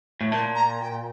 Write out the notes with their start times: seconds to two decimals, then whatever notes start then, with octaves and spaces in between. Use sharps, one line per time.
0.21 A2
0.31 A#2 A5
0.56 A#5
0.81 G5